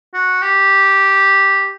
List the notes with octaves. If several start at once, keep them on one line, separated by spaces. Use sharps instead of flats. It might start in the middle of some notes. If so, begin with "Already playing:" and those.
F#4
G4